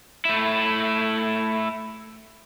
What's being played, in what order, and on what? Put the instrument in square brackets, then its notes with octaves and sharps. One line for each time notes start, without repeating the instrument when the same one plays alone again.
[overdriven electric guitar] A3 E4